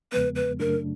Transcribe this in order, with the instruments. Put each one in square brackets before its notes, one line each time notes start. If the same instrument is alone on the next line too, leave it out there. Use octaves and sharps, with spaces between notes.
[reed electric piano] E2 C#3 F3 G#3 B3 [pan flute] B4
[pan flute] B4
[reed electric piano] F#2 C#3 F#3 A3 D4 [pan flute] A#4